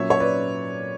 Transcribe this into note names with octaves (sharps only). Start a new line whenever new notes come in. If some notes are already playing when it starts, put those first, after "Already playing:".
Already playing: A#2 F#3 C#4 C#5 E5
C#5
B4 D5